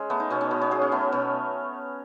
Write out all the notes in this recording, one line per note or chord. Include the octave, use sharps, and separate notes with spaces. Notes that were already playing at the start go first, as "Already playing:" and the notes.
Already playing: G#3 C#4
A3 B3
D#4
B2 C#4
C#4
B2 B3
C#4
F#3 G#4
C#4
A3 B3
B2 C#4